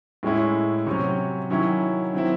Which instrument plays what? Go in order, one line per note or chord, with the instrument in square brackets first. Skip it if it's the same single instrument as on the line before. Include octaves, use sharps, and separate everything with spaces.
[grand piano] A2 G#3 C#4 E4
C3 F#3 C#4
D#3 F#3 C#4 E4
D#3 F#3 C4 E4